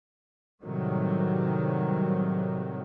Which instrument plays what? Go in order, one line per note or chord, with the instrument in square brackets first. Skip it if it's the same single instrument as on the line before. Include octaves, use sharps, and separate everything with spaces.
[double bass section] A2 C3 D#3 F#3 G3